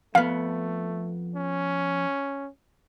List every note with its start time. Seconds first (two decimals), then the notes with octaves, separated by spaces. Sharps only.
0.15 F2 A3 B3 F5
1.35 C#4